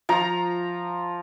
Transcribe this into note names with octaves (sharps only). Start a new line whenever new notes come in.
F3 A#5